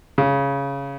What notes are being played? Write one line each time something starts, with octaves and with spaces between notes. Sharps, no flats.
C#3